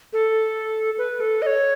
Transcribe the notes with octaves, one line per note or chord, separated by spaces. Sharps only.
A4
B4
A4
D#5
C#5